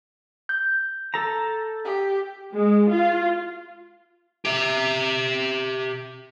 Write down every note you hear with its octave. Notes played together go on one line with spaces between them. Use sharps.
G6
A4 A#5
G4
G#3
F4
G4 E5